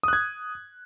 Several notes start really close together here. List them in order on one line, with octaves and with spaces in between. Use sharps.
D#6 F#6 G#6